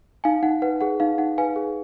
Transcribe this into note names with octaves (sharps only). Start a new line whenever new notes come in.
D#4 F5 G#5
D#4 F#5
B4 F#5
G#4 F#5
D#4 F5
D#4 F#5
B4 F5 G#5
G#4